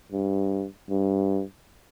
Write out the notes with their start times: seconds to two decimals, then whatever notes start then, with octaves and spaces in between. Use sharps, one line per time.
0.12 G2
0.89 G2